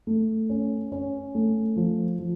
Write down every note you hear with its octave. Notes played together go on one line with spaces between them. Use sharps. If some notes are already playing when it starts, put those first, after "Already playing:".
A3
C#4
C#4
A3
F3
F3